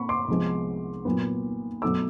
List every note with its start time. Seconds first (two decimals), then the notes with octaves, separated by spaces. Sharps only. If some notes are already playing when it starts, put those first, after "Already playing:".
Already playing: A#2 B5 C#6
0.09 C6 D6
0.28 C2 C3 F3 G#3 B3
1.05 A#2 F#3 B3
1.82 B2 F#3 A3 D6 E6